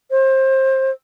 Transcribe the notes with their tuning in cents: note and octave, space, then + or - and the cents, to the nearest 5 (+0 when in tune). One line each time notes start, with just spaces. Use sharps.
C5 +25